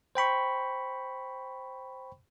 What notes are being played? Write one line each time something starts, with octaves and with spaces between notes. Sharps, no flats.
C5 G5 B5 C#6